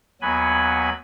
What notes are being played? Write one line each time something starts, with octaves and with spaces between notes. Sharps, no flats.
D#2 F#3 B3 G#5 B5